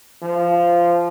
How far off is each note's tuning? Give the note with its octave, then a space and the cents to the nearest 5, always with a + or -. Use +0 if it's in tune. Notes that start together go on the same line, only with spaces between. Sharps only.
F3 -10